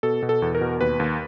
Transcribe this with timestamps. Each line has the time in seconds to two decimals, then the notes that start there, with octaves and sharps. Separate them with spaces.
0.03 B2 A4
0.22 B2
0.29 A4
0.42 E2
0.55 A#4
0.61 B2
0.81 D#2 B4
1.00 D#2